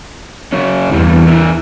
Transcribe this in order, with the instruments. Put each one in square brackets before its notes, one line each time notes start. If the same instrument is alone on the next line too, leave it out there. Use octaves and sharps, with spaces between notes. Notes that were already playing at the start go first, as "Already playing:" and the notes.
[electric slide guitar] C#3 F#3 C#4
[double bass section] E2 [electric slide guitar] G2 E3 G3
[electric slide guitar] E3 E4 A#4